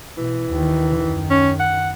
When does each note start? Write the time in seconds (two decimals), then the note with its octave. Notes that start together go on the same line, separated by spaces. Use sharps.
0.18 B2 E3
0.49 D#2 D#3
0.95 F#2 D#3
1.30 C#4
1.60 F#5